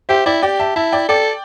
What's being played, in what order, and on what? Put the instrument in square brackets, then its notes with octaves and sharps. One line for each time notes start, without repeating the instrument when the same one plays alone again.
[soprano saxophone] G4 [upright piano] C5 E5
[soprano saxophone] E4 [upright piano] D5 G5
[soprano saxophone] G4 [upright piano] D5 G5
[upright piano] E5 A5
[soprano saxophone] E4 [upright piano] E5 A5
[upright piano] D5 G5
[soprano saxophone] A4 [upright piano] D5 G5